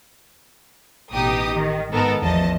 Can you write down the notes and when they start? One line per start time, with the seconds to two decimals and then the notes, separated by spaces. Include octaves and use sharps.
1.12 A1 B2 D#4 G4 D#6
1.52 D#3
1.91 G#2 D#3 B3 A4 A#4
2.21 A1 E2 F3 D#5 A5